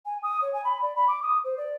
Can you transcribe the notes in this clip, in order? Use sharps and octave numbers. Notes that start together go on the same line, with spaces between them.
G#5
D#6
C#5
G#5
B5
D5
B5
D6
D#6
C5
D5